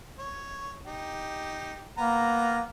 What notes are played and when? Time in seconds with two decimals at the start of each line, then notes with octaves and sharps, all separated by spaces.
0.19 C#5
0.86 D#4 G4
1.97 A#3 B3 A#5